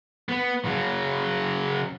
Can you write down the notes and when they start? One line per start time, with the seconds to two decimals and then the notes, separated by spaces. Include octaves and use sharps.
0.29 B3
0.65 C#3 F#3